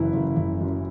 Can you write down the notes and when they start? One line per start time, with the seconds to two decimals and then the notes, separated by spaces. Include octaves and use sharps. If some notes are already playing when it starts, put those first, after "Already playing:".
Already playing: F#1 E3 E4
0.13 F#1
0.36 F#1
0.61 F#2